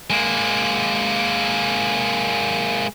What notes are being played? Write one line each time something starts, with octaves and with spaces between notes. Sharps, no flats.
G#3 A#3